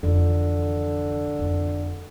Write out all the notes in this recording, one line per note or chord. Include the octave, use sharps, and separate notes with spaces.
F2 D3 E3
F2 B3